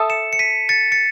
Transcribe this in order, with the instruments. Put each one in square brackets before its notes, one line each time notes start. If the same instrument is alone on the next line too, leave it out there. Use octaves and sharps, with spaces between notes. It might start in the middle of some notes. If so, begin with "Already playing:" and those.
Already playing: [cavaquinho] A4 E5 A5 D#6
[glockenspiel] C#7 E7
C#7
B6 D#7
A6 C#7
A6 C#7